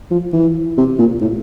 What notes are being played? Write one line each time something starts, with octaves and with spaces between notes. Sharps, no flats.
F3
E3
C3
A#2
A2